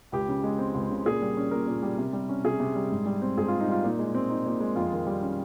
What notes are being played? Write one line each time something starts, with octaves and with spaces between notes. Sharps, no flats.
C#2 G4
C#3
G#3
C4
C#2
C#3
A#2 G#4
G3
C#4
A#2 A#4
A#2
G3
C3
G3
C#4
C3 G#4
C3
G3
G#2
G3
C4
G#2 G#4
G#2 F4
D#4
G3 F4
A#2 D#4
G#3
C4
D#4
A#2
G#3
F2 F4
D#3
G3
C#4